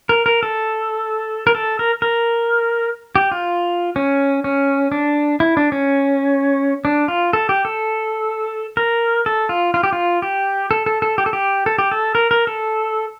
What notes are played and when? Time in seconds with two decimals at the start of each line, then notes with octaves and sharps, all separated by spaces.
0.09 A#4
0.26 A#4
0.43 A4
1.47 A#4
1.55 A4
1.79 A#4
2.02 A#4
3.16 G4
3.32 F4
3.96 C#4
4.44 C#4
4.92 D4
5.40 E4
5.57 D4
5.72 C#4
6.85 D4
7.08 F4
7.33 A4
7.49 G4
7.65 A4
8.77 A#4
9.26 A4
9.49 F4
9.74 F4
9.83 G4
9.93 F4
10.22 G4
10.71 A4
10.86 A4
11.02 A4
11.18 G4
11.26 A4
11.33 G4
11.66 A4
11.78 G4
11.91 A4
12.15 A#4
12.31 A#4
12.47 A4